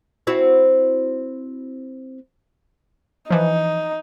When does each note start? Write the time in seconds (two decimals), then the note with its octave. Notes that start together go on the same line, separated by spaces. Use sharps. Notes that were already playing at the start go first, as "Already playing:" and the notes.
0.27 C4 E4 F#4
3.30 E3 F3 D#4